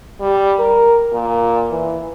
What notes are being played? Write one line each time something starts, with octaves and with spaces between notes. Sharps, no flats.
G3
A#4
A#2
E3